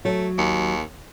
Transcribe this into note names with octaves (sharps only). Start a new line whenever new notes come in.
F#3 A3
D#2